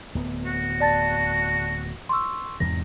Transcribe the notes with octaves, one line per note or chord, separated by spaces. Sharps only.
D1 B3
F#4
D5 A5 A6
C6 C#6 E6
E2 G#2 C3 A#6